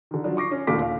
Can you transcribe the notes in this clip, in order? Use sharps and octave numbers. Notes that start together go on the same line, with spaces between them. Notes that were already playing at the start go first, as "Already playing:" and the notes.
D3 D#3
F3 F#3 D4
C#6 D6 A#6 C7
C#4
D#2 A#2 D3 A3 D6 B6
F5